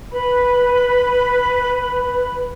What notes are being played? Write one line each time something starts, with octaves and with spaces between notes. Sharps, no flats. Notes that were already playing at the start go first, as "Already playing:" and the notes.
B4 B5